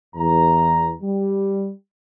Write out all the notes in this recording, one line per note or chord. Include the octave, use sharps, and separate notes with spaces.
E2 A#5
G3